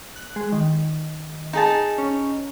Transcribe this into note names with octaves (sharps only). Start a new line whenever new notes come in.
F#6
G#3
D#3
D#4 G#4 A5
C#4